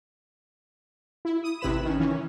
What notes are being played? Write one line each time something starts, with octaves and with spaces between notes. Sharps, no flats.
E4
D#6
A1 C3 E4 B4 B5 E7
D#3 C#4
D#3 E3 C#4